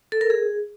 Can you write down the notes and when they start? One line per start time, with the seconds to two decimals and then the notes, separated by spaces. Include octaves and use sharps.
0.12 A4
0.21 A#4
0.30 G#4